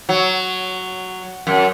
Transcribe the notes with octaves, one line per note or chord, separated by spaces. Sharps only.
F#3
F#2